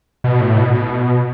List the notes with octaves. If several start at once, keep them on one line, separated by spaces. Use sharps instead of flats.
B2
A2
B2
B2